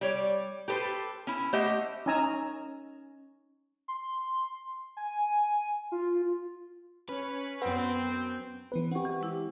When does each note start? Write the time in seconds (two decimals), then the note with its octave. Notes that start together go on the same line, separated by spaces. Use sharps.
0.01 G3 C#5 D5
0.68 G4 A4 B4 C5
1.27 C#4 E4
1.53 A3 G4 C5 D#5 F#5
2.06 C#4 D#4 G#5 A#5 E6
3.88 C6
4.97 G#5
5.92 F4
7.09 C#4 B4 C#5
7.62 F#2 B3 C4 G5
8.72 E3 B3 B4
8.91 C4 G4 F#5 C#6
9.05 E3
9.21 G#3 E4 D6